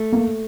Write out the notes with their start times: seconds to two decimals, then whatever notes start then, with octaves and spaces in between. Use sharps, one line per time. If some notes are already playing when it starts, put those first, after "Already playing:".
Already playing: A3
0.12 A#3